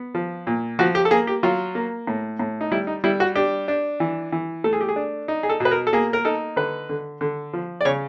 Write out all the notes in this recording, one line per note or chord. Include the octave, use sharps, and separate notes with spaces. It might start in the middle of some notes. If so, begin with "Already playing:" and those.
Already playing: B3
F3
A#2
F3 F#4
G4
A4
A#3 G#4
G4
F#3 F4
A#3
A2
A2
D#4
G3 E4
D#4
G3 E4
F#4
D4 G4
D4
E3
E3
A3 A4
G#4
G4
G#4
D4
D#4
G#4
A4
B2 B4
A#4
A4
A#3 G#4
A#4
D#4 A4
D3 B4
D3
D3
F3
D5
C#3 C#5